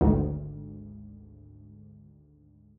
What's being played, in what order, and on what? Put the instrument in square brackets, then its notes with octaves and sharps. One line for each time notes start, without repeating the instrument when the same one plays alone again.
[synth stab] G#1 D2